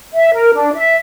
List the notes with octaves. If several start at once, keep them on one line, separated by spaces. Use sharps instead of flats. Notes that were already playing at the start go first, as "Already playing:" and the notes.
E5
A#4
D4
E5